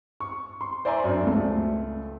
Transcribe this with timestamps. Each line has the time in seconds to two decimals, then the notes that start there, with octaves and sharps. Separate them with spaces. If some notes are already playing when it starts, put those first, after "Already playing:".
0.20 C#6
0.61 C6
0.85 C5 D5 E5 G#5 A#5 C6
1.04 F#2 D4
1.23 C#2 A3